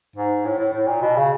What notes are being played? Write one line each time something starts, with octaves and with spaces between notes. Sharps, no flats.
G#2
A2
A2
A2
A#2
B2
C#3